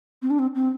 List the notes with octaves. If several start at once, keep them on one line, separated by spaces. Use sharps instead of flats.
C4
D4
C4
C4